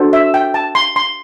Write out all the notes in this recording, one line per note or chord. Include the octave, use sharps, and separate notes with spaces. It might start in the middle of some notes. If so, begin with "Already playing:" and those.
Already playing: D4 F#4 A4 C5
E5
G5
A5
C6
C6